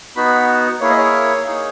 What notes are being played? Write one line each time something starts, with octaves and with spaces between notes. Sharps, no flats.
B3 D#4 F#4 B5
A#3 E4 G#4 C#5
D#5
C#5
A#3 D#4 G#4